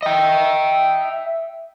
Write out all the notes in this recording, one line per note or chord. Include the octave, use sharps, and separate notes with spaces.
D#5 E5 G5